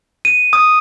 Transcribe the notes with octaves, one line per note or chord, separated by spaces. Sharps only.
D#7
D#6